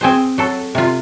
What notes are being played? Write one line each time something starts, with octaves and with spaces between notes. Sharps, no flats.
C4 G#4 C5
F#3 A4
C3 F4